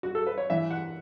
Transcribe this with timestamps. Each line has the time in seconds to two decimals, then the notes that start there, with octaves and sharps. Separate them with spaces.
0.03 F#4
0.15 A4
0.27 B4
0.38 C#5
0.50 E3 E5
0.71 F#5